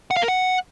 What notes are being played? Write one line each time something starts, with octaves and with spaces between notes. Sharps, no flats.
F#5
F5
A#4
F#5